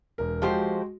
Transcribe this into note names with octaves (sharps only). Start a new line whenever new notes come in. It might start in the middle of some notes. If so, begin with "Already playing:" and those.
E1 A#4
F3 G#3 F#4 G4 C5